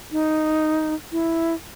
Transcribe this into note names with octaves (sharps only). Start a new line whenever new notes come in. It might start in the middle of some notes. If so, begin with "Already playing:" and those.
D#4
E4